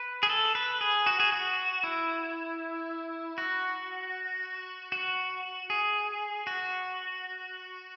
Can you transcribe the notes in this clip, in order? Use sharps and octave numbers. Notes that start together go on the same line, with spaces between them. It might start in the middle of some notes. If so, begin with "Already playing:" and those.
Already playing: B4
G#4
A4
B4
G#4
F#4
G#4
F#4
E4
F#4
F#4
G#4
F#4